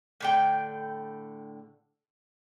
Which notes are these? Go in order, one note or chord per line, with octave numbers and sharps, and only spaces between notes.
A2 D3 G5